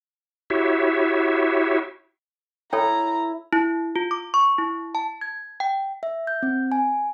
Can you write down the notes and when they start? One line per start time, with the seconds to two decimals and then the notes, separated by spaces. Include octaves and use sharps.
0.50 E4 F#4 G4 C#5 E5
2.73 E4 A4 C#5 G5 A#5
3.53 E4
3.96 F4
4.11 D6
4.34 C#6
4.58 E4
4.95 A5
5.21 G#6
5.60 G5
6.03 E5
6.27 G6
6.43 C4
6.72 G#5